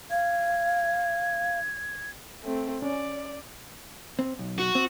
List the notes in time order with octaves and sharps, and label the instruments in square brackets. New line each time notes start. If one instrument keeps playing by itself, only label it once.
[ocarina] F5 [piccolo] G#6
[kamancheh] A3 C4
[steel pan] C#4 [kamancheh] D5
[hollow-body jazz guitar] C4
B1
[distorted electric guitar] F#4
[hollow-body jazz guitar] C4